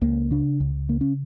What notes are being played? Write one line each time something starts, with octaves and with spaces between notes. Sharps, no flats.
C#2 A#3
C#3 D4
C#2
C#3 A#3
C#4